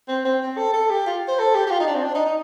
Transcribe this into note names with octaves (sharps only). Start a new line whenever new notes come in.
C4
C4
C4
A4
A4
G4
F4
C5
A4
G4
G4
F4
D#4
D4
C4
D4
D#4
D#4